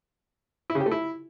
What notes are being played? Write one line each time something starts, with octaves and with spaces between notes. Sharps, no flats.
E4
C#3
G4
A3
E4